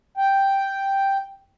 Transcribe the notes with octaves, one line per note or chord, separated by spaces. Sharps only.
G5